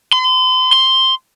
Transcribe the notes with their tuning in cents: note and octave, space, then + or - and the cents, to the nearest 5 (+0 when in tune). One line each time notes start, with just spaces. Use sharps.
C6 -40
C6 +5